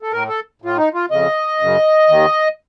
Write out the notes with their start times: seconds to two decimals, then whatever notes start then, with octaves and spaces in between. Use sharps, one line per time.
0.02 A4
0.12 A2 A#4
0.29 A4
0.62 A2 F4
0.78 D#4
0.94 F4
1.10 F2 C#3 D#5
1.60 F#2 C#3
2.09 D#2 D#3